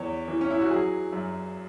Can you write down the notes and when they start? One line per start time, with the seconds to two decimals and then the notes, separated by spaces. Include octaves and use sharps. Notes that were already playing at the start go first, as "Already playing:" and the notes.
Already playing: E2 C#5
0.28 E3
0.41 C#4
0.50 E4
0.61 F#4
0.70 F#3 G#4
1.13 F#2